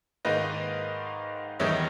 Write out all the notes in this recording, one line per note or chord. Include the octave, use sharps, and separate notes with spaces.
G#2 D#3 A#3 D#4 B4 D#5
E2 D#3 G3 B3 D#4 C#5 E5